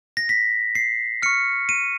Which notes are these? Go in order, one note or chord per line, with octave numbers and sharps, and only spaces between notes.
A#6
B6
C7
C#6 F6 C#7
D#7